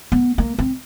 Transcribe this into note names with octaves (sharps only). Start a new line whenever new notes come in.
B3
A#3
C4